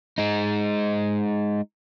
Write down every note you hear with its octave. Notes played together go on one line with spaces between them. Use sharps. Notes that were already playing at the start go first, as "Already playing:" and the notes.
G#3 D#4